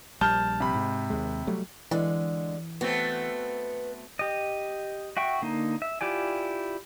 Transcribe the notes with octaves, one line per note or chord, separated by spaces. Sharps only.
A#1 G3 A5 F6 G6
C3 B5
G#2
D#2 G#3
F#3 G3 A3
D3 E3 G#3
A3 B3 C4 F#4
G4 D#5
F#4 E5 G5 C#6
D3 A#3 D#4
E5
E4 F4 G4 D5 G#5